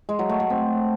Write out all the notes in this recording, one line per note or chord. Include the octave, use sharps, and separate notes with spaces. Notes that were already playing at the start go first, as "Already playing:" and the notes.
G#3
F#3
A3
A3
C4